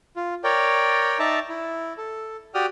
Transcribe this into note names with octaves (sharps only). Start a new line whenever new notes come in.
F4
A#4 C#5 D5 G5
D#4 D5 E5 A5 A#5
E4
A4
F#4 G4 D5 G5 D#6 F6